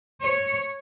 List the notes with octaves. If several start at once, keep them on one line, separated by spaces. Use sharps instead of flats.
C#5